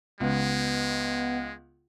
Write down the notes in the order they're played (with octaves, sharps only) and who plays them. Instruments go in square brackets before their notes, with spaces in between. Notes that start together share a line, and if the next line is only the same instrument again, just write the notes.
[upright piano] C#2 [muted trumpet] G#3 [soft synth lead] B3